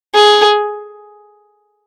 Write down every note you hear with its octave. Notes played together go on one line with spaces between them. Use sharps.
G#4